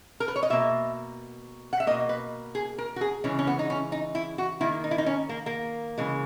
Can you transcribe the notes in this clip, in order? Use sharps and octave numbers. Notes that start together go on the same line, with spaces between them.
A#4
B4
C#5
D#5
B2 A#3 E5
F#5
E5
B2 A#3 D#5
B4
G#4
A#4
F#4
G#4
C#3 E3 G#3 C#4
C#4
B3
D#4
C#4
D#4
E4
F#4
D#3 A#3 E4
D#4
E4
D#4
C#4
A#3
A#3
C#3 E3 G#3